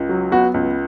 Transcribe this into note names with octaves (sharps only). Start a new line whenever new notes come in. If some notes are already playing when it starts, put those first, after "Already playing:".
Already playing: C#2
F#3
B3 F#4
C#2